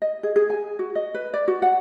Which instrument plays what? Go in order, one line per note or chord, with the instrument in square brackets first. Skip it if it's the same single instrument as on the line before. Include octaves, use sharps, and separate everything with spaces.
[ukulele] D#5
G#4
G#4
G#5
F#4
D#5
B4
D5
F#4
F#5